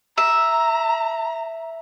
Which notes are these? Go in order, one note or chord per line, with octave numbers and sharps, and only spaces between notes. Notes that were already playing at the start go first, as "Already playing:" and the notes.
E5 A#5